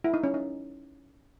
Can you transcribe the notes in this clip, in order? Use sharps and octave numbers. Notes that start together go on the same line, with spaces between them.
E4
D#4
C#4
D#4